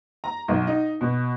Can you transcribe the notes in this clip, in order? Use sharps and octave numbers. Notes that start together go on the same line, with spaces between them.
A#5
B1
D#4
B2